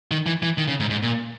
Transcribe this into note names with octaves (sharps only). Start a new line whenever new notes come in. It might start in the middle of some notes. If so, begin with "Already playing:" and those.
D#3
E3
E3
D#3
C#3
G#2
G#2
A#2